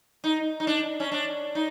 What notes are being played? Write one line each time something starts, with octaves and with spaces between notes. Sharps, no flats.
D#4
D#4
D4
C#4
D4
D#4